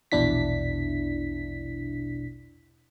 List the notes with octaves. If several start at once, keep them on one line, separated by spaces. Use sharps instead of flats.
A#1 E2 B2 D4 E4 B6